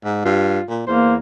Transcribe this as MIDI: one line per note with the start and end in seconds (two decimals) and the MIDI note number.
0.05 0.21 44
0.25 0.60 43
0.25 0.66 65
0.69 0.86 46
0.87 1.18 40
0.87 1.15 58
0.87 1.14 72